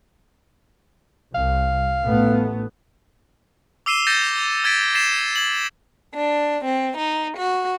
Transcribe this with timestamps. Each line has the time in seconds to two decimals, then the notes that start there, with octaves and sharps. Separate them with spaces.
1.35 C2 F5
2.03 A1 A3 B3
3.86 D6 E6 C7 D#7 E7 G7
4.07 G6 A6 A#6 C#7 D#7 E7
4.64 E6 G#6 A6 B6 D7
4.94 G#6 A6 B6 C7 E7
5.36 G#6 F#7
6.14 D4
6.64 C4
6.97 D#4
7.36 F#4